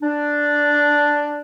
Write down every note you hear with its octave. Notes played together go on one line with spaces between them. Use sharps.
D4